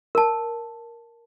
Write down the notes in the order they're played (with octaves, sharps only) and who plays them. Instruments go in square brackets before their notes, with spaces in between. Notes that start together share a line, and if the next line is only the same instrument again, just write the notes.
[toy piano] A#4 A5